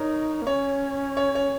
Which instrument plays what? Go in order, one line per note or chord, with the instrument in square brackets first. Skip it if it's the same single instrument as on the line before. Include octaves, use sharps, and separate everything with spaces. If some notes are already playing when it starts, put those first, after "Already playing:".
Already playing: [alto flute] D#4 [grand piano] A#4 C#5
[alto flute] A#3
[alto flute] C#4 [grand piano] C#5
[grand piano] C#5
C#5